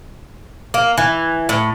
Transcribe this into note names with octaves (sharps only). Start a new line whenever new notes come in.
A#3
E3
A2